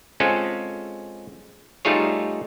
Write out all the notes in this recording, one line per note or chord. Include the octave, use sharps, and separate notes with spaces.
G#3 C4 C#4 F4 A4
G3 A3 D#4 F4 G#4 C#5